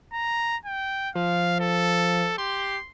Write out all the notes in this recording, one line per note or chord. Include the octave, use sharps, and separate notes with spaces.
A#5
G5
F3 F5
A4
G4 C6